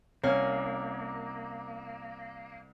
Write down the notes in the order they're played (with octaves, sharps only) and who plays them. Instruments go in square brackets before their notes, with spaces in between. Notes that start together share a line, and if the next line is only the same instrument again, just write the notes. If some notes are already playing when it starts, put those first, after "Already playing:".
[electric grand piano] C2 F6 [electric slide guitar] A#3 [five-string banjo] C#4